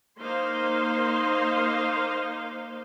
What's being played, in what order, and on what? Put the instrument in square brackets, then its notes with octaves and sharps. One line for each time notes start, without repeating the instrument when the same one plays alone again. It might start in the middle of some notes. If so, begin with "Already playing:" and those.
[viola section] A#3 D#4 C5 F5 C6